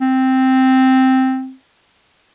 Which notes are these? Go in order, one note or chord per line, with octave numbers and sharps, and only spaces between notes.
C4